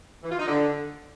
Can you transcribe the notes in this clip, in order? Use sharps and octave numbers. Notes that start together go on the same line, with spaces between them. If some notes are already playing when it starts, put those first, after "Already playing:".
E3
F4
D#4
D3